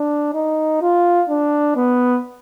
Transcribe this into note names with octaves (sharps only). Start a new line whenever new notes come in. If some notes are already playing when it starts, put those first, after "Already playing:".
Already playing: D4
D#4
F4
D4
B3